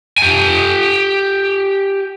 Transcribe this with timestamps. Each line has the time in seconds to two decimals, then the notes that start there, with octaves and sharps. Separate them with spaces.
0.18 G4 G#5